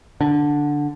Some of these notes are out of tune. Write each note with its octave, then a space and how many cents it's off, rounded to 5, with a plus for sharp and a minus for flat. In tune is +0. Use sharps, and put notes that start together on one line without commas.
D3 +0 D4 +0